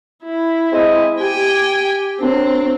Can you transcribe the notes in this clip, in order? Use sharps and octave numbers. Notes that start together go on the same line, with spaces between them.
E4
G#3 C4 D#5
G4 G5 G#5
F#2 C4 D4